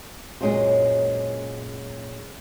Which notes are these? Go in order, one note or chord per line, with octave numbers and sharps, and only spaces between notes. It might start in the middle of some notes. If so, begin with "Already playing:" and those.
F#2 A#2 G#3 C#4 F4 C5